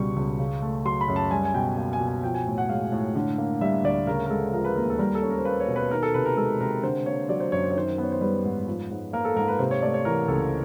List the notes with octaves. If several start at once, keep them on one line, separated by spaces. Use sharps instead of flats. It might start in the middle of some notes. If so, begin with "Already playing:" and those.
Already playing: C#2 B2 G3 C#6
C#2
C#3
A3
F#3 C6
B5
F#2
A5
G3 G#5
G#5
B2 G5
A#3 G5
G#5
B2
G#5
F3 G5
G#5
A2
F#5
G#3 F5
A2
D3
A#3
G3 E5
D2 D5
C#3 A#4
A#4
G#3 A4
F3 A#4
B4
D#2 A#4
A4
G3 A#4
A4
C#4
A#4
C5
A#3 B4
C#5
B2
B4
D#3 A#4
A4
C3 B4
A#4
G#3 A4
C3 A#4
D3 C5
A#3 C#5
F#3 D5
C5
F#2 C#5
C5
C#5
D#3 C5
B3
C#5
C5
G3 B4
G#2
F3
G#2
A#3 A#4
A4
G#2 A#4
B4
C3 C5
C#5
A3 D5
C#5
E3 A#4
C#2 A4